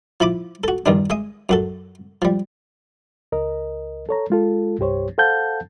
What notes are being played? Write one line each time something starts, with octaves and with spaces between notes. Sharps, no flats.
F3 E4 B5 D6
F#4 A4
E2 G2 D#3 D4
G#3 E5 D#6
F#2 F#4 A4
F3 G3
C#2 A#4 D#5
A4 C#5 A#5
G#3 F4 A4
C2 G2 G4 C5 C#5
A4 C5 F5 F#5 A5 G6